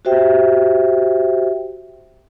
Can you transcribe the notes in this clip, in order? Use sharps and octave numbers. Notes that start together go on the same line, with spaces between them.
F#4 G4 C5 E5 G5